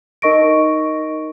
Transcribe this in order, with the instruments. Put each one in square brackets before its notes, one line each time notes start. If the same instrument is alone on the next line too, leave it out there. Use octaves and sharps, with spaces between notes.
[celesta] D#4 A#4 D#5 C#6 A#6 D7